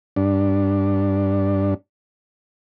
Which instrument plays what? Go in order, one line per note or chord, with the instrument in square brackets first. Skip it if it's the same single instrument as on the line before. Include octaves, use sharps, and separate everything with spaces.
[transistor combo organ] G2 D4